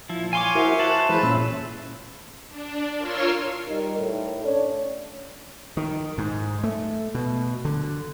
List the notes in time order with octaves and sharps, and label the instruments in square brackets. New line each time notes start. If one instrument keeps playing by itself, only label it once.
[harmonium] A#2 [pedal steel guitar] F3 E4
[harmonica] C#5 F5 [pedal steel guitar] G#5 C6 D6
[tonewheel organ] E4 F#4 A#4 [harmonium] C5 E5
[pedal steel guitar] A5 [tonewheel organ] F#6
[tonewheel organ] E3 G#3 C5 [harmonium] G#4 [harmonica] B4
[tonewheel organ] A#2 C#4 E5 [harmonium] F4
[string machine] D4
F4 A#4 C#5 C6 E6 F6
[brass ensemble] G3 D#4 A#4
A2
C#4 D4 C#5
[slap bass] D#3
G#2
A3
B2
D3